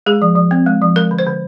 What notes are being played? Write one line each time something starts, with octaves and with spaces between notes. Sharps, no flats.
G#3 G#4
F3
F3
C4
G#3
F3
G#3 A#4
D3
C5
D3